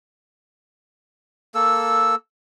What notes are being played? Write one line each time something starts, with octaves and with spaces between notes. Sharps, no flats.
A#3 A4 E6